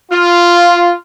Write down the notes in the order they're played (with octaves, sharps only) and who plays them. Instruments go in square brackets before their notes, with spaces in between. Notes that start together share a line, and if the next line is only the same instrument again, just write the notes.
[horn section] F4